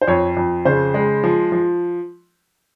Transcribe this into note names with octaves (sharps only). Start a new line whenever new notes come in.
C5
F2 C#5
F2
C#3 C5
G#3
F3
F3